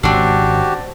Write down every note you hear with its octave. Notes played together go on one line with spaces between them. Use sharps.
G#1 C#3 C4 D4 F#4 G4